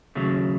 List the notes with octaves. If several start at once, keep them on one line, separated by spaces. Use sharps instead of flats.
D#2 C#3 F#3 A3